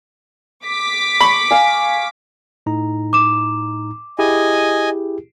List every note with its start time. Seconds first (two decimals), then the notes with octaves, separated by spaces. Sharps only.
0.65 D6 B6
1.21 B5 C#6
1.51 F5 G#5
2.66 A2 D#4 A#5
3.13 D6 E7
4.19 E4 G4 G#4 D#5 G#5